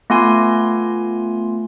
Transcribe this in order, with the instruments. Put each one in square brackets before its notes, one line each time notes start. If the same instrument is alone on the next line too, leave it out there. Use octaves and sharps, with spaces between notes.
[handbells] A3 B3 F4 G#5 C6